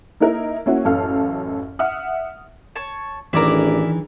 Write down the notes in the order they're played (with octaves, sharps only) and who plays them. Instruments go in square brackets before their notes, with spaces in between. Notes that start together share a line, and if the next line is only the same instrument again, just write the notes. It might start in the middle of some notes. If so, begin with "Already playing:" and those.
[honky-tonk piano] A#3 D#4 E4 A#4
A#3 C#4 E4 F#4
A1 F#2 A4 F5 F6
E5 F#5 D#6 F6
[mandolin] C#5 A5 [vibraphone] C#6
[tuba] A1 [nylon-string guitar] D#3 E3 [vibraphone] D4 G#4 [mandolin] A#4 D5 E5